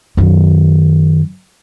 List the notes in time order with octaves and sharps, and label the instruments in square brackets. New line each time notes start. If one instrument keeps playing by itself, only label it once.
[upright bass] F#2 D#3